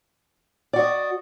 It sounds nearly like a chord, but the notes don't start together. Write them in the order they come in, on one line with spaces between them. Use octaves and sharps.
D5 F#4 D#5